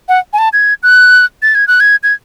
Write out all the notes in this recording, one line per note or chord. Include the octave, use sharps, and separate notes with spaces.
F#5
G#5
A5
G#6
F#6
A6
G#6
F#6
G#6
G#6